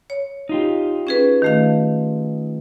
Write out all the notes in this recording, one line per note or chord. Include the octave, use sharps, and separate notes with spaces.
C#5
D#4 F4 G4
C#4 G#4 B4
D#3 A3 F5